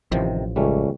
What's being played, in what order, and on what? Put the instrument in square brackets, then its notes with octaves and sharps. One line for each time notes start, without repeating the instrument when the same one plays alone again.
[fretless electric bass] A1 F3 [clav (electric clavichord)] C3 D#3
[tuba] C#2 [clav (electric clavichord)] G3 A3 C#4